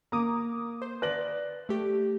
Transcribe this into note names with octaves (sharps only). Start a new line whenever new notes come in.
A#3 A#5 D6 D#6
C5
B4 D5 F#6 A#6 F#7
A3 G4